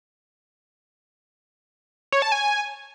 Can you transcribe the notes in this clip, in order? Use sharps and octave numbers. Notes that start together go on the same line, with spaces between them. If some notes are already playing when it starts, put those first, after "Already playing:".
C#5
A5
G#5